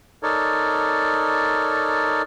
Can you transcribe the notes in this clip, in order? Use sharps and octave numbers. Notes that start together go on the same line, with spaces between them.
D#4 A4 A#4 C#5 D5